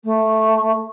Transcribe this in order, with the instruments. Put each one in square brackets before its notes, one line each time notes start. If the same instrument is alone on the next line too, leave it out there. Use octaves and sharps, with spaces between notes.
[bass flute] A3